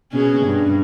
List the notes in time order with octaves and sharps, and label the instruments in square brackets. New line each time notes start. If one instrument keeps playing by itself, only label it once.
[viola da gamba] B2 C#4 G#4
G2